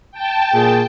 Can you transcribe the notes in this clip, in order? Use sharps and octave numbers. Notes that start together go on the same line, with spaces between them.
G5 A5
A#2 G#4